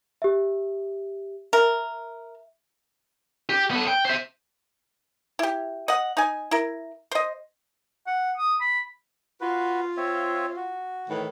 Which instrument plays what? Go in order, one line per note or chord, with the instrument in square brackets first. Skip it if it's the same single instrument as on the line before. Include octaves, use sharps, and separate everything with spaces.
[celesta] G4 E5
[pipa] A#4 [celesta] E5
[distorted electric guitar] G4
B3 A4
G5
C5 E5
[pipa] E4 G4
D#5 F#5
D#4 G#5
E4 A#4
C5 D#5
[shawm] F#5
D#6
B5
[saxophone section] F4 [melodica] F#4 B4
[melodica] C4 C#5 E5
F#4
[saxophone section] A2 D#3 E3